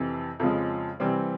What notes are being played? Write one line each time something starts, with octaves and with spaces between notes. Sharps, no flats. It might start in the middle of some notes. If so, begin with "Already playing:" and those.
Already playing: F2 C3 E3
F2 C#3 F3 G#3
C3 E3 G3 C4